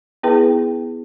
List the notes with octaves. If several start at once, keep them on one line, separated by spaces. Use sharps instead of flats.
B3 E4 G#4 B4 G5